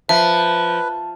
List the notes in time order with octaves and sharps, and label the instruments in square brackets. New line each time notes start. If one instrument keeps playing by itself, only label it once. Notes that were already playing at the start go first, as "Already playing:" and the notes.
[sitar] F3 [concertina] B4 [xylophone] E5 [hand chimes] A5